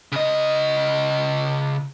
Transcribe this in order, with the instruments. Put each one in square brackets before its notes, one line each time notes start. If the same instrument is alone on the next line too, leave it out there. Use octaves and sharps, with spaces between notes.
[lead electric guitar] C#3 D#5